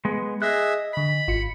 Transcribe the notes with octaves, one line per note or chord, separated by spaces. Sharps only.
G#3 B3
G#4 D#5 E5 F#6
D3 B5 B6
G#1 F4 C#7